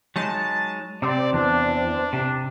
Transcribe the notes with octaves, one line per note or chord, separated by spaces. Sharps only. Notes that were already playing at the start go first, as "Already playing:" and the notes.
F#3 G#3 D#4 A5
C3 C4 D5
E2 D4
C3